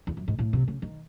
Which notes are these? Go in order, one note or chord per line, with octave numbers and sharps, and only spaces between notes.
E2
F#2
G#2
A2
C3
C#3
D#3